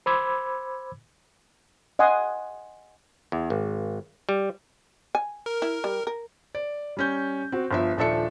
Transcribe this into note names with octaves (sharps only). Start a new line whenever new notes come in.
C5 B5 D6 E6 G#6
D#5 F#5 G#5 C6 D#6
E2
G#1
G3
G#5
A#4
E4
G3
A#4
D5
G3 C#4 G6
C4 F#4
G1 F3 E5
D#1 F3 D4 A4 E5 C#7